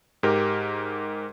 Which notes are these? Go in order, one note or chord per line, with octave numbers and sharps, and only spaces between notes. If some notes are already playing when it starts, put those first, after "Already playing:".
G#2 G4 A#4